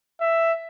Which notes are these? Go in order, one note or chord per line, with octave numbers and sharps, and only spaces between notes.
E5